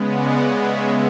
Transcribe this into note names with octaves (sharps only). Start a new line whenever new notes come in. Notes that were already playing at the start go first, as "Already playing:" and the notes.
Already playing: C#3 G#3 B3
D5 F#5
C#5 E5